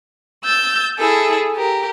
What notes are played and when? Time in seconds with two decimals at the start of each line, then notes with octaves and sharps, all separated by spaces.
0.45 E6 G6 A6
0.98 E4 G#4 A4
1.55 G4 A#4